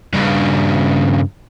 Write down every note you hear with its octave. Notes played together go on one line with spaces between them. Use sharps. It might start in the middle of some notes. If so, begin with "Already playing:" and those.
G2 C#3